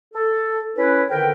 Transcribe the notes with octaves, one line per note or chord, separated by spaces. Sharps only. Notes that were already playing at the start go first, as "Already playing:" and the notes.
A4
C#4 E4 B4
F2 D3 D#3 A#4 B4 G5